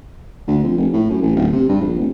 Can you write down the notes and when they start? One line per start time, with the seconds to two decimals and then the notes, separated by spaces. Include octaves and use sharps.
0.47 D2
0.64 F2
0.77 F1
0.93 A2
1.10 F#2
1.22 A1
1.36 D1
1.52 C3
1.69 G2
1.81 A#1
1.99 F1